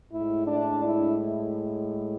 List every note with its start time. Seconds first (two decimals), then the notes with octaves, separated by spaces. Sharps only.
0.11 A2 G#3 E4
0.47 D4
0.84 E4